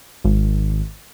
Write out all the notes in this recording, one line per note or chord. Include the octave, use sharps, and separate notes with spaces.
G#1